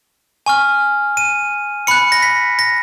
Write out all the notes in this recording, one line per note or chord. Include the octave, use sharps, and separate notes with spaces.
G#5 C#6 F6
D#7
B5 F#6 C#7
A#6
B6
A#6